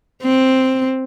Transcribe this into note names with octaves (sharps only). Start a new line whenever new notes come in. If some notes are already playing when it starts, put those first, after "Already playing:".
C4